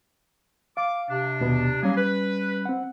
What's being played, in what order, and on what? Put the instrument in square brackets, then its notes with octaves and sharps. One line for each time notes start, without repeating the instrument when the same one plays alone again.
[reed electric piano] F5 [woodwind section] D6
[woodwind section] C3 D4
[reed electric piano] D#2 B2 B3
[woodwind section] F#3 A#3 G#4 [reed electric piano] G3 C#4
[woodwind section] B4
[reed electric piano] C4 F#5